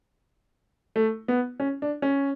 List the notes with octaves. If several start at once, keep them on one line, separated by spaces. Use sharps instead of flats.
A3
B3
C#4
D4
C#4